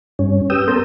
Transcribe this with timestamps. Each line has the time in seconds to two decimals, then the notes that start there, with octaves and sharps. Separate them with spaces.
0.19 G2 C#4
0.50 C#4 G4 B4 G5 D#6 E6
0.68 B3 A4 A#4 C6 G6